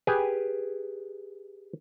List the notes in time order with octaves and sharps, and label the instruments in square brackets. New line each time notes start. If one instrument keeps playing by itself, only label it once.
[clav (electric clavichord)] G4 G#4 B4 G#5